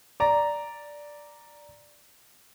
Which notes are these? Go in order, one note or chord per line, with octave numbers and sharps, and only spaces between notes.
D5 A#5